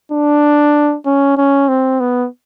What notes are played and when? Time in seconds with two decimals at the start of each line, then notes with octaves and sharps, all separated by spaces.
0.12 D4
1.06 C#4
1.37 C#4
1.68 C4
2.00 B3